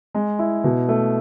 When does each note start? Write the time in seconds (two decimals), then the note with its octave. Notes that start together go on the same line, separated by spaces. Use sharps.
0.15 G#3
0.39 E4
0.64 B2
0.89 A3